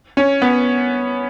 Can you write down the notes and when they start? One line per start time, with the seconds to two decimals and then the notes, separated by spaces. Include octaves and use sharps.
0.17 C#4
0.42 B3